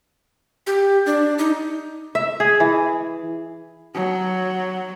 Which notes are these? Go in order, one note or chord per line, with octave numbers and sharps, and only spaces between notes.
G4
D4
D#4
E5
G#4
E3
F#3